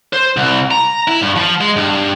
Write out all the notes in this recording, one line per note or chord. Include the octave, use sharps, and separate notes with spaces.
C5
C2
A#5
E4
G2
F3
G#3
G2